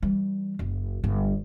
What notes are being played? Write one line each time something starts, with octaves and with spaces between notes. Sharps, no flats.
E3 G3
F#1
G1